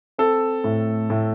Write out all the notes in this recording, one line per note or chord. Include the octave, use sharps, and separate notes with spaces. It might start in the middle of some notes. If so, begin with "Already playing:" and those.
C4 A4
A2
A2